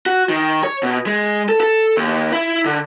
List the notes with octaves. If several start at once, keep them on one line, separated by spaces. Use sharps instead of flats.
F#4
D#3
C#5
B2
G#3
A4
A4
D#2
E4
D3